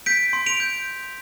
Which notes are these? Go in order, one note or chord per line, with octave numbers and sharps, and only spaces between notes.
G6 B6 D7
C6
D7 F7
G6